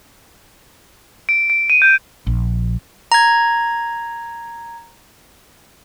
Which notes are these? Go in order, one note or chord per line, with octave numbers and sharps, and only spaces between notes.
D7
D7
D#7
G6
A#1
A#5 G#6